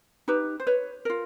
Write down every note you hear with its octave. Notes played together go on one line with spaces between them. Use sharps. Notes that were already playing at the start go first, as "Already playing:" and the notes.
D#4 G4 B4
C5
B4 C#5
F4 A#4